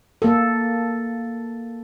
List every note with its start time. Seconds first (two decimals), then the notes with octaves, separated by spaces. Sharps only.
0.22 A#3 A4